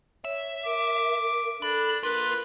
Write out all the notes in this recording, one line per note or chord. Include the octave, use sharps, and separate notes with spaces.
C#5 E5
A#4 D6
D4 A4 B5
A#3 F4 A#4 B4